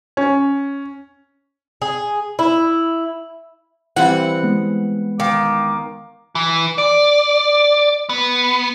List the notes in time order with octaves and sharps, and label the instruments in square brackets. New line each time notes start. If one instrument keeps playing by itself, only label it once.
[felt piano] C#4
[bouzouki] G#4
E4
[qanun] E3 G3 C4 [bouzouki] F#5
[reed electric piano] G#3 B3
[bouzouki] D#3 [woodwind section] F5 D6
[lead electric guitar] E3
D5
B3